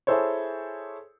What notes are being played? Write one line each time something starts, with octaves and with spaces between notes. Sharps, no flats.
E4 G#4 A4 C5 C#5